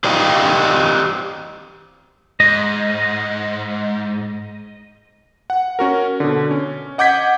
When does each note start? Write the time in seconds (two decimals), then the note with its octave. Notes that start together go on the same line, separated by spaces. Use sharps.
0.04 G4 C5 D5 D#5 F5 G5
2.40 G#2 D#5
5.50 F#5
5.79 C#4 F#4 A#4
6.20 B2 D3
6.51 C#4
6.98 D#5 F#5 D6 G6 G#6 B6